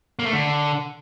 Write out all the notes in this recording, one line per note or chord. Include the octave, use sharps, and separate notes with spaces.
A#3
A3
D3